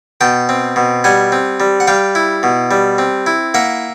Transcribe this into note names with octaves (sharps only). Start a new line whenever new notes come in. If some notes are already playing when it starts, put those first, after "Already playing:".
B2 G5 A5
C4
B2
G3 F#5 G#5
C4
G3
F#5
G3 F5 G5
E4
B2
G3
C4
E4
A#3 E5 F#5